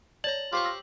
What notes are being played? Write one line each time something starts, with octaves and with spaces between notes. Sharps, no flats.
C#5 D5 A5 A#5 F#7
F4 G4 C5 C#6
E6 A#6